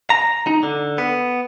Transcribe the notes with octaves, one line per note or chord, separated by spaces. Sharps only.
A#5
D#4
D3
B3